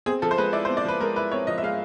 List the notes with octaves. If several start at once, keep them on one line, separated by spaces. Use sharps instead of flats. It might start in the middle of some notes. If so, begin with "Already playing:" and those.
C4 G#4
F3 A4
C5
G#3 B4
E4 D5
C5
C4
D5
F3 B4
G#3 A#4
E4 B4
C4 C#5
F3 D#5
E5
G#3 F5